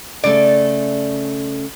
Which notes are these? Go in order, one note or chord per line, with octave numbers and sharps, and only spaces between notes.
C#3 A3 D5